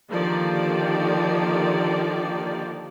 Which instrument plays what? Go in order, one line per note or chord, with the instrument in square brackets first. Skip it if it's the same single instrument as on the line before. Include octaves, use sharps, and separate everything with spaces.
[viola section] D3 D#3 F3 A#3 G4 D5